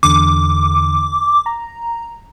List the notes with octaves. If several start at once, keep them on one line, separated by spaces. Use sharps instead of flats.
E2 D3 D6
A#5